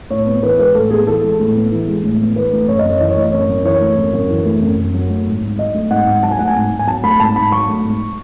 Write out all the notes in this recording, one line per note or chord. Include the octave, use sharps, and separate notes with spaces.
A2 C#5
B3
E3 B4
G#3 B4
A2 A4
B3 G#4
E3 A4
G#3
A2
B3
E3
G#3
A2
B3
E3 B4
A3
F#2 C#5
D#5
F#2
C#5
E3 D#5
C#5
A3
D#5
F#2 C#5
F#2
E3 C#5
A3
F#2
F#2
E3
A3
F#2
F#2
F#3
A3
G#2
G#2
F#3 D#5
A3
G#2 F#5
G#2
F#3 A5
G#5
A3 F#5
G#5
G#2
G#2
G#5
F#3 A5
A3 B5
G#2 A5
G#2 B5
F#3 C#6
A3
G#2